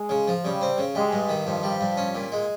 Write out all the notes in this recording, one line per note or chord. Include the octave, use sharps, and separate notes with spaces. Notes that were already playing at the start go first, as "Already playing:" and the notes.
Already playing: G#3
C#3
F3
C#3 G3
C4
C#3
G3 G#3
G2
D#3
G2 F3
G3
G2
C#4
A#2
G#3